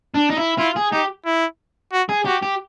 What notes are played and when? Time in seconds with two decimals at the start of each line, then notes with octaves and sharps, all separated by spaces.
0.14 D4
0.30 D#4
0.37 E4
0.58 E4 F4
0.76 G#4
0.92 D#4 G4
1.26 E4
1.92 F#4
2.09 G#4
2.26 F#4 G4
2.43 G4